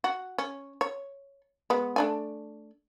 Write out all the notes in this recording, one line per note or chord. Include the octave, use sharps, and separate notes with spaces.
F#4
C#4
C#5
G#3 B3
A3 D4 G#5